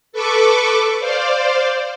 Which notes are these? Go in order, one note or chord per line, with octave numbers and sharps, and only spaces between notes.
A4 B4 C#6 D6
C5 D5 F5